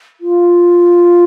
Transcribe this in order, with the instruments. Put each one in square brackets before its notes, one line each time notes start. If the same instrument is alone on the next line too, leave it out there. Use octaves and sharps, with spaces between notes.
[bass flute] F4